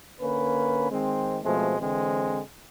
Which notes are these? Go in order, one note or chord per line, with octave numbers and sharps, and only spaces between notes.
D3 A#3 C#4 B4
D#3 G#3 C4
B2 F3 G#3 A3 C4
D3 E3 G#3 C4